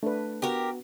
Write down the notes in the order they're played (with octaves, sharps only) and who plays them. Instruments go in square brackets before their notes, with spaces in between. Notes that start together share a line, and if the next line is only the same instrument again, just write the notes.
[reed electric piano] A3 [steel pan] D4 B4
[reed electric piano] B3 F#4 [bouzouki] G4 A#4